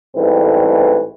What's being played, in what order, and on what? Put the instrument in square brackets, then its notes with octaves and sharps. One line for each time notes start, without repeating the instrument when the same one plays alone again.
[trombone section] A1 G#2 E3 G3 A3 C4